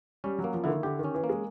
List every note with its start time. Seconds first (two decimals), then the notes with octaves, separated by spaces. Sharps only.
0.24 G3 C#4
0.39 F#3
0.44 A#3
0.54 F3
0.64 D3 E4
0.69 D#3
0.83 D3 G4
0.99 D#3
1.04 C#4
1.14 E3
1.24 A#3
1.29 G#3